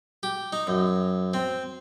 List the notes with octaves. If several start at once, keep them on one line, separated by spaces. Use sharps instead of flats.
G4
D#4
F#2
C4